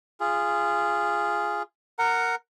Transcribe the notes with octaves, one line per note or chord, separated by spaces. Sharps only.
F4 G#4
A#4 F#5 A#5